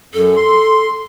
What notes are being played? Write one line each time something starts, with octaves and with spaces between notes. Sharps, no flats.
F#2 A4
C6